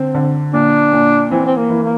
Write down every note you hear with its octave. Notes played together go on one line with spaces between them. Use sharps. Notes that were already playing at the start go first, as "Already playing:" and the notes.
Already playing: D3 C4
D3
A#2 D4
A#2
E3 C4
C4
A#3
E3
A#3